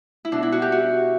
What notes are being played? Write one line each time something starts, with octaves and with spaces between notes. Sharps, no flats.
E4
B2 D4
E4
F#4
G4
F#4